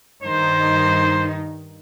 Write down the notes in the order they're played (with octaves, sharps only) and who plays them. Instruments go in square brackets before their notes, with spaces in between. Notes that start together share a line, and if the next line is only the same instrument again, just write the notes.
[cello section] G2 D#3 D#4 [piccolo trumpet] C5